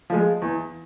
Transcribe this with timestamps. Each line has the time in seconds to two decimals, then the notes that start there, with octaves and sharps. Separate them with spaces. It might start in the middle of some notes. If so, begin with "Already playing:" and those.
0.10 F3 G#3
0.42 E2